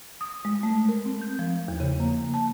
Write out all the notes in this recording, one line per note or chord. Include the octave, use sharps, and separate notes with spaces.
D#6
G#3
A3
A#4
C4
G6
F3
E2
C#3
A#3
A5